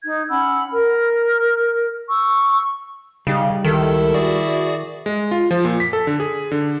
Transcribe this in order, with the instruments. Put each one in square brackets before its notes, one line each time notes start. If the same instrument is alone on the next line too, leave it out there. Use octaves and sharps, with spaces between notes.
[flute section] D#4 G#6
C#4 F#5 B5 E6
A#4
C#6 E6
[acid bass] C#3 [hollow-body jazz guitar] G3 D#4 G4
[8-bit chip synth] C#2 A4 [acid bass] D#3 [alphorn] E4
[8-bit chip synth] F#4 G#4 D5
[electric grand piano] G#3
F4
F3
A#2
B6
A4
D3
G#4
D3